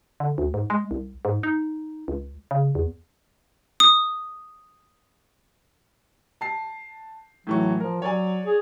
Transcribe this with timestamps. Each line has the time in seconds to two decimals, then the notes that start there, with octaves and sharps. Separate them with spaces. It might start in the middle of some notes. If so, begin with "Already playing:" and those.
0.20 D3
0.38 D2
0.54 G#2
0.70 G#3
0.91 C2
1.25 G#2
1.43 D#4
2.08 C#2
2.51 C#3
2.75 E2
3.80 D#6
6.41 A5 C7
7.47 A2 E3 F#3 C#6
7.80 F3 A#4
8.02 F#3 C#5 D5 G#5
8.46 G#4